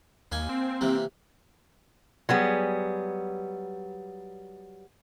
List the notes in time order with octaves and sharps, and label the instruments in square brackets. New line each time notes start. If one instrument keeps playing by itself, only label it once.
[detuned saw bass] D#2 [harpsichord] A#3 G#5
[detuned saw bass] C4
[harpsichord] C3 E3 A#3
[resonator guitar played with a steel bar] F#3 G3 B3 G#4